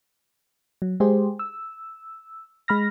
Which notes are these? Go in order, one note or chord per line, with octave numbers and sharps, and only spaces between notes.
F#3
G#3 G4 G#4 C5
E6
G#3 B5 F6 A#6